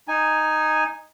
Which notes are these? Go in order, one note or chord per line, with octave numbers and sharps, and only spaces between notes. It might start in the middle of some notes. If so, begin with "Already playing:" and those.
D#4 G#5